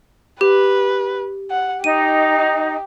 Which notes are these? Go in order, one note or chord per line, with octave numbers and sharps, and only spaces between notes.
G4 B4
F#5
D#4 G4 D#7